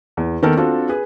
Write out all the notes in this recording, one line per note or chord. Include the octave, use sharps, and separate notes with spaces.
E2
D#3 A#3 B3 A4 A#4
C4 D4 F4 F#4 A4
G#4 B4